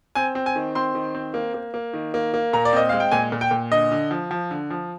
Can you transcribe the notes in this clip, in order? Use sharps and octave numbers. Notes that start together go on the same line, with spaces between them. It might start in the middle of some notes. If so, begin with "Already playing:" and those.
C4 G#5
C4
G#5
D#3
C4 C6
D#3
C4
A#3
A#3
A#3
D#3
A#3
A#3
A#2 A#5
D5
C4 D#5
G#3 F5
G5
A#2 G#5
A#2
G5
A#2
D3 D#5
D3
F3
F3
D3
F3